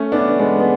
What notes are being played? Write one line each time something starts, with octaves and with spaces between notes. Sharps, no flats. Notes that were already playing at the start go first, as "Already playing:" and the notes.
Already playing: A3 C#4
B3 D4
G#3 B3
B3